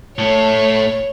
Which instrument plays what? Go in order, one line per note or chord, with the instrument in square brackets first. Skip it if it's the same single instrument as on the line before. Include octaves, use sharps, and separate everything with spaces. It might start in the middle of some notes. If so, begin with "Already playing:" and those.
[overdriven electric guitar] A2 A3 [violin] C#5